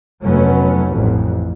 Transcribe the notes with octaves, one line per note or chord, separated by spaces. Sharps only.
F1 F#3 A3 B3 C#4
A1 F2